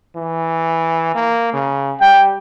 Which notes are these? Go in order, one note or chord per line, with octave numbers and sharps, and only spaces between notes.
E3
A#3
C#3
G3 G5